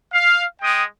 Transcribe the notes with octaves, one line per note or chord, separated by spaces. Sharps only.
F5
G#3 G5 D#6